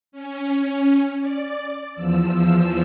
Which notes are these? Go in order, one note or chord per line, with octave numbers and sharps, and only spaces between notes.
C#4
D5
E2 F3 E6